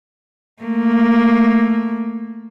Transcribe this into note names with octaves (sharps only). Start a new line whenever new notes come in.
A3 A#3